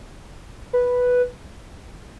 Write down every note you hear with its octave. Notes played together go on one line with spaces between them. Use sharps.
B4